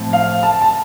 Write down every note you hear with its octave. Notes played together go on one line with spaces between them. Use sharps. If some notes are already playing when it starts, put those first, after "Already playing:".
Already playing: A2 F3 C4
F5
A5
A5